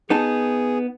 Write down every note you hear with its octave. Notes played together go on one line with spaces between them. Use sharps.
B3 D#4 G#4 A5